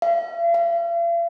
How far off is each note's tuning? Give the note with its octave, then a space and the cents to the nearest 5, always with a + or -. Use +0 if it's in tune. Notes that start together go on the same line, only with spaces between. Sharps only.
F5 -45
F5 -45